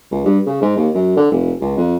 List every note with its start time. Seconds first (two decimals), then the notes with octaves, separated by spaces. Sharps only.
0.12 C#2
0.25 G2
0.47 C#3
0.62 G#2
0.77 D#2
0.94 F#2
1.17 D3
1.31 F1
1.61 C#2
1.78 F2